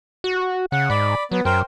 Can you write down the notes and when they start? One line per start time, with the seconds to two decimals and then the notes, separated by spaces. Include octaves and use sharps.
0.24 F#4
0.72 C#3 F#5
0.90 G#2 D5 B5
1.31 F#3 B3
1.45 F#2 A#4 C5 G5